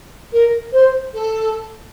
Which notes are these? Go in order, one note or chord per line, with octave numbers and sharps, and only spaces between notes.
A#4
C5
A4